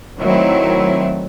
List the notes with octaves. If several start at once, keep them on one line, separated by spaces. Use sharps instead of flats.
D#3 F#3 A3 C4 E4